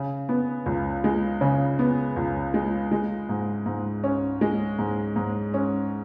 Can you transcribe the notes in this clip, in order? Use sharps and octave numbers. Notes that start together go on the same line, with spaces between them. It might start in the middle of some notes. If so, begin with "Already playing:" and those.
Already playing: C#3
B3
C#2
G#3
C#3
B3
C#2
G#3
G#3
G#2
G#2
C#4
G#3
G#2
G#2
C#4